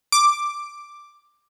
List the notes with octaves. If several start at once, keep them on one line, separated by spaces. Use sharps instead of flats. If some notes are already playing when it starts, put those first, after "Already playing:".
D6